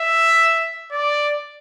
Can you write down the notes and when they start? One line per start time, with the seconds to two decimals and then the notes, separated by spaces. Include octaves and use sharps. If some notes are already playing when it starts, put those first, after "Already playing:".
Already playing: E5
0.92 D5